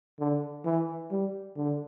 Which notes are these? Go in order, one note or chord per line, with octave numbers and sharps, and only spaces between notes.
D3
E3
G3
D3